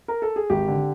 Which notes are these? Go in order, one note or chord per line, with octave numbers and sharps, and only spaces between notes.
A#4
A4
G#4
G#1 G4
D3